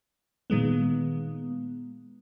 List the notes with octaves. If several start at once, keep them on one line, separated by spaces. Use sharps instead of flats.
A#2 D#3 G#3 B3